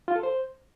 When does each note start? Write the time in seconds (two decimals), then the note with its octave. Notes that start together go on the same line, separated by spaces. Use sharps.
0.08 F4
0.16 A4
0.23 C5